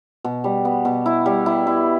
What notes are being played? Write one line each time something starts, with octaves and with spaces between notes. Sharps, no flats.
B2
G3
B3
B2
E4
G3
E4
E4